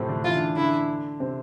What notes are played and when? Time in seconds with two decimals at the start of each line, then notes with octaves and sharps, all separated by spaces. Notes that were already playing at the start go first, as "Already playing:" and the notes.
Already playing: A2 C3 F3 A3 C4
0.09 D3 D4
0.24 E3 E4 F4
0.35 D3 D4
0.56 D3 D4 E4
1.20 C3 C4